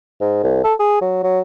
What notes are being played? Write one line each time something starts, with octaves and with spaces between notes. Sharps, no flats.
G#2
C2
A4
G#4
F#3
F#3